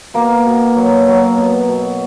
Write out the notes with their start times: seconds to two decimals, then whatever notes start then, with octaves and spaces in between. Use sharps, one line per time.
0.14 B2 A#3
0.46 B2
0.76 F#3
1.08 F#3
1.38 B2
1.69 B2